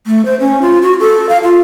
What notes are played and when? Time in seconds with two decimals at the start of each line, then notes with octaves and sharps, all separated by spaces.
0.07 A3
0.25 C5
0.40 C#4
0.61 F4
0.82 F#4
1.00 A4
1.29 F5
1.43 F4